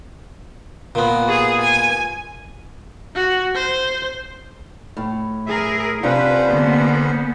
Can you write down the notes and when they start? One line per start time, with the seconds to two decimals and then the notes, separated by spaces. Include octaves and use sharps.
0.95 A#2 B3
1.29 G#4
1.62 G#5
3.15 F#4
3.55 C5
4.97 A2
5.47 G#4 A#4 E5
6.03 C3 C#4 D4 F4 B4 C5 F#5
6.48 D3 A#3 B3